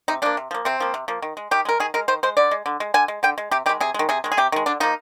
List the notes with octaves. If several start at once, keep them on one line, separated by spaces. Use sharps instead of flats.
C3 D#4
F3 A#3 D4
C3
F3 A#3
C3 C4
F3 A#3
C3
F3 A#3
D#3
G#3
D#3 G4
G#3 A#4
D#3 G#4
G#3 A#4
D#3 C5
G#3 C5
D3 D5
G#3
D3
G#3
D3 G#5
G#3
D3 G5
G#3
C3 G4
D#3 G#3 G4
C3 G#4
D#3 G#3
C3 G#4
D#3 G#3
G#4
C3 G4
D#3 G#3
D3 D4
F3 A#3 D#4